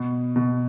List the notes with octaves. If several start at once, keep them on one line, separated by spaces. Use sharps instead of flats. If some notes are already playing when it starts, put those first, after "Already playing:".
Already playing: B2
B2